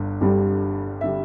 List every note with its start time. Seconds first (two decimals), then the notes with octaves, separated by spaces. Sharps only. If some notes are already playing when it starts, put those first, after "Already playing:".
Already playing: G1 G2
0.21 G1 G2 D3 G3
1.01 D3 G3 E5